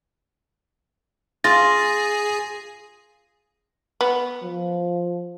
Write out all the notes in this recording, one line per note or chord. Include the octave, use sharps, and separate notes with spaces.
F4 G#4 A6 A#6
B3
F3